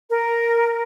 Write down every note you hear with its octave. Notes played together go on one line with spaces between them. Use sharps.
A#4